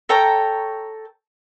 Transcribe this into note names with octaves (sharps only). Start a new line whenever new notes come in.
A4 C#5 G5 A#5